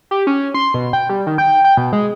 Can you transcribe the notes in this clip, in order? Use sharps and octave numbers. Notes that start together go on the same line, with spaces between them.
G4
C#4
C6
B2
G5
G3
D#3
G5
G5
B2
G#3